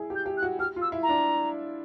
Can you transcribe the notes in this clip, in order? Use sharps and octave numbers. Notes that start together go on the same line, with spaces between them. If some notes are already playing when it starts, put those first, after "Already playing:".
Already playing: E4 G#4
G4
G6
G4
F#6
F#4
G4 F6
F4
E6
E4
A#5
D4